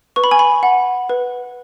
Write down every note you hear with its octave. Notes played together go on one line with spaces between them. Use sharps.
B4 C#6
B5
G#5
B5
F#5
B4